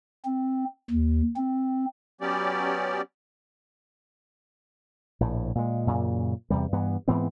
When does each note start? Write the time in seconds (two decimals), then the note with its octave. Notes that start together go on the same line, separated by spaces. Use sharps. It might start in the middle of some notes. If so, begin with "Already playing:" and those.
0.25 C4
0.90 D#2
1.36 C4
2.21 F#3 B3 C#4 G4 D5
5.20 A#1 A2
5.55 A#2 G#3
5.87 F#2 A#2 C#3
6.50 E2 C3 G3
6.72 G2 E3 B3
7.08 G#2 E3 B3 C4